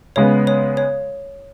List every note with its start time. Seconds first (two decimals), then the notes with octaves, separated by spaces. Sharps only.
0.16 C#3 G#3 B3 C#5
0.47 C#5
0.77 C#5